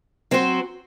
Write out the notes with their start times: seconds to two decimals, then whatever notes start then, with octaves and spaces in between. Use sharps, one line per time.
0.31 F#3 C4 F#4 C5